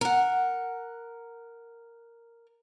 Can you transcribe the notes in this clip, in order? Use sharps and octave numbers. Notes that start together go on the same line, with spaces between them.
A#4 F#5